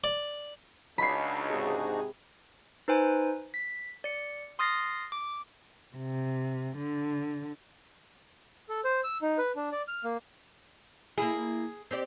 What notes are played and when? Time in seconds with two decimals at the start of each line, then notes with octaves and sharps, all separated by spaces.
0.04 D5
0.98 C#2 D4 D#4 F#4 B5 C7
1.49 G#2 C3 G#4
2.88 D#4 B4 C5 G#5
3.54 B6
4.04 D5 C#7
4.59 C6 D#6 F6 A6 A#6 C7
5.12 D6
5.96 C3
6.78 D3
8.69 A4
8.84 C5
9.04 E6
9.22 D#4
9.38 B4
9.56 D4
9.72 D5
9.88 F6
10.04 A#3
11.18 A#3 E4 G#4
11.91 C4 G4 D5